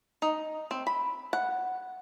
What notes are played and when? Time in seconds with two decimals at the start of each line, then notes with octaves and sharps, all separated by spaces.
0.22 D#4
0.71 C4
0.87 B5
1.33 F#5